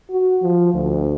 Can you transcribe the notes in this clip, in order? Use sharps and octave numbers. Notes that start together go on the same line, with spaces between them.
F#4
F3
D2